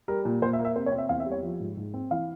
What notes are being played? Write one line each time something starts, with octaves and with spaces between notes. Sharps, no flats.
G3 A#4
A#2
A#2 C5
E5
A#3
E5
C3 C5
C#5
C4
E5
E2 F5
E5
G3
C#5
F3
G#2
G#2
C4
E3 F5